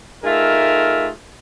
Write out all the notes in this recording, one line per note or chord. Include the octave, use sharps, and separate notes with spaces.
A3 D#4 F4 G#4 A#4 E5